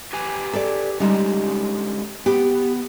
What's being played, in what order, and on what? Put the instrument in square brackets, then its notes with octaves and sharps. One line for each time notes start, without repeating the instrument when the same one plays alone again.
[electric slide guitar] G4 B4 G#5
[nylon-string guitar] A4 D5
[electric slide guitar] D3 G#3 C#4 [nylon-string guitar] G3 D#4
[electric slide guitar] B3 [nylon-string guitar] G4